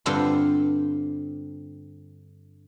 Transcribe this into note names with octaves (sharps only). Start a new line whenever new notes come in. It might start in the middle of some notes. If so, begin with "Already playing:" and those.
G2 D3 C4 F4 B5 C6